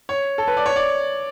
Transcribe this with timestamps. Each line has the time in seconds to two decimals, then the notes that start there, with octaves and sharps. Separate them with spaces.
0.09 C#5
0.38 A4
0.48 B4
0.57 D5
0.66 C#5
0.76 D5